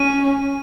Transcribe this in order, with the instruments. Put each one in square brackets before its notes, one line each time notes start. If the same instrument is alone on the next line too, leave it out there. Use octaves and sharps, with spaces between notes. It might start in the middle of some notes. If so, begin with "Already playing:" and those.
Already playing: [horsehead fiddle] C#4 [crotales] D#7